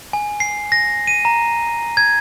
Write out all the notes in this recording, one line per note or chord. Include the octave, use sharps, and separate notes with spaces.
G#5
C7
A#6
D#7
A#5
G#6